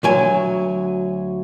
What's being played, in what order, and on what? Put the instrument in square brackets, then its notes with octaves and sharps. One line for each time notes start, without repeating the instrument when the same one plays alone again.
[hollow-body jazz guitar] D2 F#3 G#5